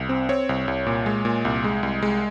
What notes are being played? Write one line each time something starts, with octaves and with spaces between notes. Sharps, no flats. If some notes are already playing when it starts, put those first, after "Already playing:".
Already playing: C2
C4
C4 C#5
C2
C2
A#2
G#3
A#2
C2
G#3
C2
G#3